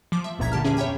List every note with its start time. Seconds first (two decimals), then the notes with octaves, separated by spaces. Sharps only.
0.12 F3 D6
0.24 E5
0.39 G1 C#2 A#2 A#5 G#6 B6
0.52 D3 G4 A5 F6
0.64 E2 C#4 G#4 E5 D6
0.77 C#5 E5 G5 B5